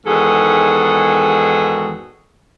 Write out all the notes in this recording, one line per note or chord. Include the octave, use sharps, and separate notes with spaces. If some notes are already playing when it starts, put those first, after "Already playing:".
E2 G#2 D#3 F#4 G#4 A4